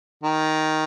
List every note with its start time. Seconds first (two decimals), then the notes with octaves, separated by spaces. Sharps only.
0.23 D#3